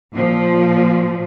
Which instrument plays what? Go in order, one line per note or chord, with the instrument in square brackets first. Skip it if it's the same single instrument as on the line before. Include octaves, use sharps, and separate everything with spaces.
[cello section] A#2 F3